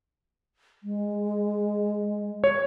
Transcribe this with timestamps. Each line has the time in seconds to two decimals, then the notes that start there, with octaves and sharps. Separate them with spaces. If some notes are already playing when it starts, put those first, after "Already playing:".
0.83 G#3
2.44 C#5